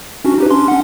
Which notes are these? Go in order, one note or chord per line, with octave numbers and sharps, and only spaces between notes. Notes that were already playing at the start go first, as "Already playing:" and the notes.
C#4 D4 F#4
D#4 G4 B4
C#4 D4 C6
C#4 F#5